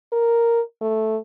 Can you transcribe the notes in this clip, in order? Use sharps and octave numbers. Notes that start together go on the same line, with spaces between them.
A#4
A3